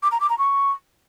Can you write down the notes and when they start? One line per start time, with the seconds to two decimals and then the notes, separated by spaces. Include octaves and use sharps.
0.03 D6
0.12 A#5
0.20 D6
0.29 A#5
0.38 C#6